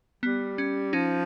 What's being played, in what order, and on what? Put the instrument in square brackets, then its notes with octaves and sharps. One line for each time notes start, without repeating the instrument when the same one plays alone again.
[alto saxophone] G3 [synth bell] B3
[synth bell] C#4
[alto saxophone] F3 [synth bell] C#4 D#4